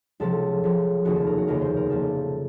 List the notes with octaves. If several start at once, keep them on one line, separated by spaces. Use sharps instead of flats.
C#2 C3 F3 A4
C#2 C3 F3
F1 D#2 C#3 F#4
A4
A#4
F#4
F1 D#2 C#3 A#4
C5
A#4
A#1 A#2 F3 A#3 A4